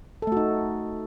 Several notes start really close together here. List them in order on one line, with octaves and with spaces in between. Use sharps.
A4 A3 F#4 D#4